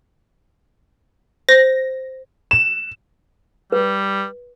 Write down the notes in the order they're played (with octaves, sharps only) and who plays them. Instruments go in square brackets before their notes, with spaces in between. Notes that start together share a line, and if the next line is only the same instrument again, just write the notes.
[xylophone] C5 [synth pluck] A#6
[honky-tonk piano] E7
[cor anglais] G3 [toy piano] B4